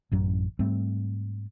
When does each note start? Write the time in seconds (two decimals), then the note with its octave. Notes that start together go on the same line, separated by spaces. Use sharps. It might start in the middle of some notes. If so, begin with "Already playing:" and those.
0.12 A1 F#2 F#3
0.59 G#2 G3 A3 C4